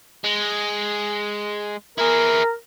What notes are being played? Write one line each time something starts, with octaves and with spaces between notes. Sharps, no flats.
G#3
E4 G#4 A#4